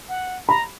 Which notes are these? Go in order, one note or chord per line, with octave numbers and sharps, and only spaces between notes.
F#5
A#5 B5